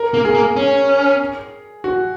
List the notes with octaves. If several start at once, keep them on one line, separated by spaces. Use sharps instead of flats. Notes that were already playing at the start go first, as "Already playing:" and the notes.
Already playing: A#4
A#3
G#4
A#3
C#4
F#4